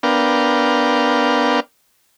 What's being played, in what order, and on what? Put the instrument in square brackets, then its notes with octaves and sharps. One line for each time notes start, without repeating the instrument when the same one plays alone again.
[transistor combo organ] B3 D4 A#4 F5 G5